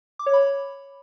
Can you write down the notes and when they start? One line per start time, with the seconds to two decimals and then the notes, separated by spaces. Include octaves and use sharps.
0.19 D6
0.26 C#5
0.33 B5